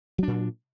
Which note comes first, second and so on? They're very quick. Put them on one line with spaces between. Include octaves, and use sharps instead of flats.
F#3 D4 A#2